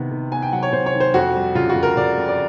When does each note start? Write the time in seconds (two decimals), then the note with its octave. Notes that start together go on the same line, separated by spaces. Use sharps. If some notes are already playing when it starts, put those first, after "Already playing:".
Already playing: C3 D#3 B3
0.11 D#3
0.32 B3 G#5
0.42 G5
0.52 F#3 F#5
0.63 C#5
0.72 C3 C5
0.86 C#5
0.94 D#3
1.00 C5
1.14 F2 F#4
1.35 G3
1.55 C#3 F4
1.70 F#4
1.76 F2
1.83 A#4
1.97 C#3 D5
2.17 F2
2.28 D5